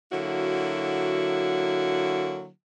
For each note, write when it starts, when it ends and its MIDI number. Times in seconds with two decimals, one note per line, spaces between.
0.12 2.48 50
0.12 2.48 54
0.12 2.48 58
0.12 2.48 64
0.12 2.48 66